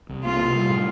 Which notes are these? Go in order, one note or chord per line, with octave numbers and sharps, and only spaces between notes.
C2
A#3 F4
C3
G3
A2